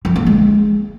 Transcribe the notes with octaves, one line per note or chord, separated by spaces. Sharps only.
F3
A#3
G#3